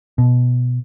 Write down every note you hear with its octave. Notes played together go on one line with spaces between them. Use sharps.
B2